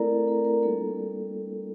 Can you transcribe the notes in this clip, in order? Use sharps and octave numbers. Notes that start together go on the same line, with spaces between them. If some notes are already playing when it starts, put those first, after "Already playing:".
Already playing: A3 C4 E4 A4 A#4 D5 A#5
A4
A4
A#4
G3 A#3 D4 F4 A4